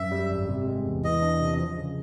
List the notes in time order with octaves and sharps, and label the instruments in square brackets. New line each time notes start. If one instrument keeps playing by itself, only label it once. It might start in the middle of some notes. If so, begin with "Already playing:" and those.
Already playing: [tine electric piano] F#2 [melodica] E5
[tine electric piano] G3
G#1
C3
G#3
E2
[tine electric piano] E3 [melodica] D#5
[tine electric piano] D4
C3
F3
C#3